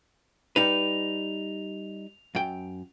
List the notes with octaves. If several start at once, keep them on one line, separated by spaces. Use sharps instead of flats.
G3 D#4 B4 F7
F#2 G5